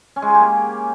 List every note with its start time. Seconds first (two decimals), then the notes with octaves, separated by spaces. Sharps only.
0.16 C#4
0.22 G#3
0.28 G#4
0.35 G4
0.41 A#3